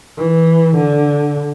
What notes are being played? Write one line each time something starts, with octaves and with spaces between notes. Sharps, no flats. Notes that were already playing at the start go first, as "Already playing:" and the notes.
E3
D3